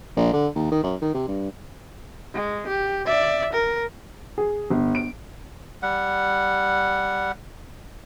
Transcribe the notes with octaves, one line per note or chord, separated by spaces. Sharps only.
A#1
D3
D#2
D#3
F#2
D#3
C3
G2
G#3
G4
D5 E5
A#4
G#4
G1
D7
G3 F#5